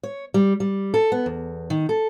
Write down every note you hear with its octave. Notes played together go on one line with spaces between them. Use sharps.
C#5
G3
G3
A4
B3
E2
D#3
A4